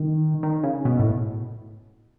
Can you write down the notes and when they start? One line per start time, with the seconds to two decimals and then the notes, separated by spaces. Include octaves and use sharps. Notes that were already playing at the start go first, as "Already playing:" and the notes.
Already playing: D#3
0.43 D#3
0.63 C#3
0.85 B2
1.00 A2